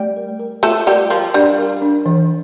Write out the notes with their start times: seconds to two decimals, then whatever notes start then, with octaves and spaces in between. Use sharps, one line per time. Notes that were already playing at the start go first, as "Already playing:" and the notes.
Already playing: G3 A3 G4
0.16 A#4
0.39 A#4
0.63 A3 F4 A4
0.86 G3 G4 A#4
1.10 F3 F4 A#4
1.34 G3 D4
1.58 A#4
1.82 D4
2.06 E3